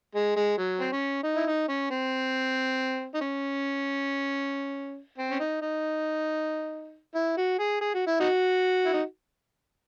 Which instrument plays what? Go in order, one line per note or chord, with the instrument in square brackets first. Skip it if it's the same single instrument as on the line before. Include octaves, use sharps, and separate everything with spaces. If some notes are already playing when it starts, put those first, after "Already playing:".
[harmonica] G#3
G#3
F#3
C4
C#4
D#4
E4
D#4
C#4
C4
D#4
C#4
C4
C#4
D#4
D#4
E4
F#4
G#4
G#4
F#4
E4
D#4 F#4
E4
D#4